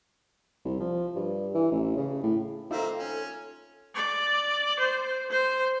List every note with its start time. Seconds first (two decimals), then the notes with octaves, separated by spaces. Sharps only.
0.65 C2
0.80 F3
1.16 G2
1.54 E3
1.71 A1
1.97 C#3
2.23 A2
2.71 A#3 C4 D#4 F4 A4 E5
2.97 C#4
3.95 D5
4.80 C5
5.30 C5